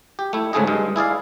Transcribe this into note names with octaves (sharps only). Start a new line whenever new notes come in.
G4
A3 E4
D2 G#2 C#3 A3 G#4 D#5
G2 G#3
E4 G#4 D5 F5